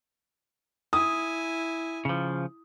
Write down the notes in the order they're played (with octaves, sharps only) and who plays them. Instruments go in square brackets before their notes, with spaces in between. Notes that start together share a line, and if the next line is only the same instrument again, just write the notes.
[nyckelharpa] E4 G#5 [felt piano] D#6
[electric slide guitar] C#3 F3